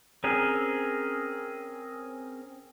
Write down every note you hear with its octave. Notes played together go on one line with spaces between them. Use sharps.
C4 C#4 G#4 A#4